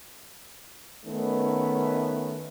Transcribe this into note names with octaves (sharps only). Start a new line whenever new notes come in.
D#3 A3 B3 C#4